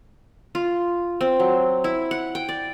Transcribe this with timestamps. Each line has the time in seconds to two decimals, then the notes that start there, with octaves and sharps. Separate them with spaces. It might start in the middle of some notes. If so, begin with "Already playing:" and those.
0.55 F4
1.21 C4
1.40 F#3
1.84 E4
2.11 F#5
2.35 G5
2.49 D5